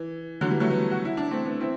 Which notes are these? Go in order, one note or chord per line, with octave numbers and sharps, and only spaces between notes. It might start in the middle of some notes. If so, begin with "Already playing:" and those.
Already playing: E3
D3 F#3
E3 G3
F#3 A3
G3 B3
F#4
E4
D4
A3 C4
B3 D4
C4 E4